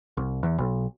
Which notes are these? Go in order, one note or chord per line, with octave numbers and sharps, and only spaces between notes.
C2
E2
B1